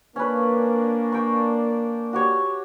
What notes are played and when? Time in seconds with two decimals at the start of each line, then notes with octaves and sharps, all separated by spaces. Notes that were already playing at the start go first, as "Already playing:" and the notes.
0.16 A#3 C#4 D4 B4
1.12 G5 C#6
2.13 F#4 G4 C#5